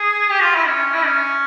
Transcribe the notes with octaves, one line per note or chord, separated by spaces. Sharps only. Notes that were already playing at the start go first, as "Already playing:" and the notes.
Already playing: G#4
G4
F4
E4
C#4
E4
C#4